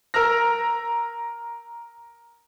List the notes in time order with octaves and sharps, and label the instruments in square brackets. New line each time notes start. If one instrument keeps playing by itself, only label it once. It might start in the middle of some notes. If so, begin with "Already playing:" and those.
[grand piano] A#4 A#5 E6 F6 A#6